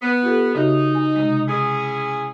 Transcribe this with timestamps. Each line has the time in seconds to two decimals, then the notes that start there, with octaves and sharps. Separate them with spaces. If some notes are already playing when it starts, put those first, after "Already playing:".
0.01 B3
0.23 F4 G4 A4
0.55 C#3 D#4 F#4 E5
0.95 G#5
1.16 C3 G#3
1.48 C#4 E4 G#4